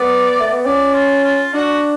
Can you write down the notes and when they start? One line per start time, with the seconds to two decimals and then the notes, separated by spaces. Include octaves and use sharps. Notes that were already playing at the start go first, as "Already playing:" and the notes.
Already playing: B3 D5
0.40 A3
0.52 B3
0.65 C#4 D5
0.94 F4
1.24 F4
1.53 D4 F#4